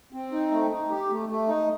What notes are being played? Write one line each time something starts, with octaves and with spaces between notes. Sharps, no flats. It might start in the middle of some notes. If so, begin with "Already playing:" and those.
C4
D#4
A3
D#4
G4
A3
A3
D#4